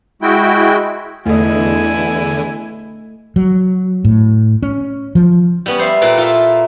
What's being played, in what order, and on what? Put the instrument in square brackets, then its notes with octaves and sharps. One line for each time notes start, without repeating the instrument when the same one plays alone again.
[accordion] G#3 E4 F#4 G5
[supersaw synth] E2 D3 [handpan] A3 D#5 [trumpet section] E4 G#5
[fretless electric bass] F#3
A2
C#4
F3
[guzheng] G3 B3 C#4
C5 E5 F5
A#2 C4 A4 B4
F4 E5